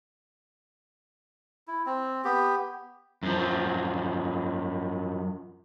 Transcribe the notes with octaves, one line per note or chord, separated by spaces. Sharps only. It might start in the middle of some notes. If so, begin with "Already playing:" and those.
E4
C4
B3 G4
F#2 F3